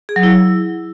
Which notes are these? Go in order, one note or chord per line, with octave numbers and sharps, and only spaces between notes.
G#4
F#3
E4